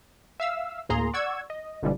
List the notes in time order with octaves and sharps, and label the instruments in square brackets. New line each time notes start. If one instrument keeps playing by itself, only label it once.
[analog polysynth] E5 F5 E6
D2 A2 A#3 G#4 A#5 C6
D5 F#5 C#6 E6 G#6
D#5
G1 B2 D3 E3 F3 G3